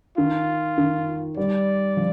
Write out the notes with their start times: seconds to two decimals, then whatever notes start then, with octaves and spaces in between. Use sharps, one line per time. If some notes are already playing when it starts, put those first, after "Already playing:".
0.17 D#3 F4
0.78 D#3
1.37 G3 D5
1.97 F3